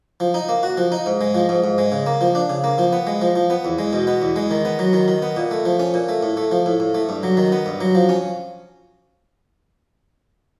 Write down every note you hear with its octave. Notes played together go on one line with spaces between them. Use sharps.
F3
D#4
A#3
F#4
F3
D#4
G#2
G#3
F3
G#2
G#2
G#3
C#3
A#3
F3
D4
C#3
A#3
F3
B3
G#3
F3
F3
B3
E2
G#3
B2
B3
E2
G#3
D#3
B3
F#3
D#3
D#3
B3
A#2
A3
F3
C#4
A#2
A3
A2
A3
F3
A2
A2
A3
G2
F#3
D#3
B3
G2
F#3
F3
C#4